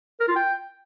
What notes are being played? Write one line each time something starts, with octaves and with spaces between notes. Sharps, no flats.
A#4
F4
G5